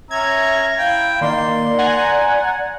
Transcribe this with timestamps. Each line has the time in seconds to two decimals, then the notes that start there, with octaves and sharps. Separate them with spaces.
0.11 C#4 E5 A#5 E6 G#6
0.78 E4 F5 G5
1.21 D#3 A#3 D5 C6
1.78 F#5 G#5 A#5